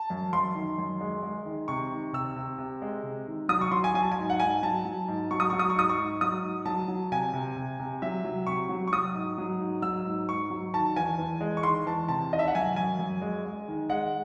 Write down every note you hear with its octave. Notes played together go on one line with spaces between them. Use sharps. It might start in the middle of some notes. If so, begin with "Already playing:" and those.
Already playing: A5
F#2
F#2 C6
D#3
F#2
G#3
G#3
D#3
C3 C#6
D#3
C3 E6
C3
C3
G#3
C3
D#3
F#3 D#6
C#6
F#3 C6
G#5
F#3 G#5
A5
G#5
G#2
F#5
G#2 G#5
F#3 A5
F#3
G#2
F#3 C#6
D#6
F#3 C#6
D#6
C#6
G#2 D#6
C#6
G#2
F#3 D#6
G#2
F#3 A5
F#3
C3 G#5
C3
C3
C3
F#3 E5
F#3
C3 C#6
F#3
C#6
F#3 D#6
G#2
F#3
G#2
F#3 E6
G#2
G#2 C#6
F#3
D#3 A5
E2 G#5
E2
G#3
C#6
D#3 C6
E2 A5
C3 A5
D#3 D#5
E5
F#5
F#2 G#5
F#2 G#5
F#2
G#3
G#3
D#3
G#3 F#5